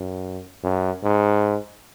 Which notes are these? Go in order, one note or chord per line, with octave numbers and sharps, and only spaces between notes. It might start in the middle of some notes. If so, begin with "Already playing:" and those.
Already playing: F#2
F#2
G#2